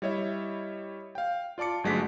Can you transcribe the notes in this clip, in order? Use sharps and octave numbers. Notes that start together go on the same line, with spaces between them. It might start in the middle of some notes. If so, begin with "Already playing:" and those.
G3 E4 C#5 D#5 E5
F5 G5
F4 D5 A5 D6 C#7
G1 F#3 G#3 A3 D4 B6